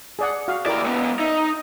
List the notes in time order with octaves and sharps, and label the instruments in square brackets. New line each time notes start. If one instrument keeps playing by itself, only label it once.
[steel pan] G#4 D5 F#5
F#4 F5
[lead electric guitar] D#2 D5 [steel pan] E4 G4 A#4
[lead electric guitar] G#3 B3
[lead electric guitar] D#4 [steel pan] E5